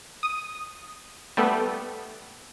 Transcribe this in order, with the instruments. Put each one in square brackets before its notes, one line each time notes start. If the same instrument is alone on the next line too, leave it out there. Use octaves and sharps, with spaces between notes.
[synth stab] D#6
G3 A3 B3 A4